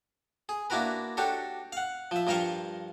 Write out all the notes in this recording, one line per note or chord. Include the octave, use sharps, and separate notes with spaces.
G#4
A#3 D4 E4 F#4 A#4 B4
D4 F#4 G4 A4 C#5
F5 F#5
F3 E5
G2 F3 F4 A#4 F5 C#6